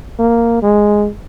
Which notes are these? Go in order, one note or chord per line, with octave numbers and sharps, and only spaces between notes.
A#3
G#3